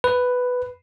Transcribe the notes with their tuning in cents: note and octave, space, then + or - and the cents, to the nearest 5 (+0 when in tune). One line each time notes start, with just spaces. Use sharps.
B4 +5